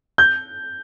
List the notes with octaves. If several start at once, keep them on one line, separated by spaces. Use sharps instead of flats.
G6